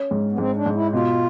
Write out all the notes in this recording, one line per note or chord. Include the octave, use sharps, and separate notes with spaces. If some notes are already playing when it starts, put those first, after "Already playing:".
Already playing: C#4
G#2
B3
G#2 C4
D4
G#2
E4
B2 F4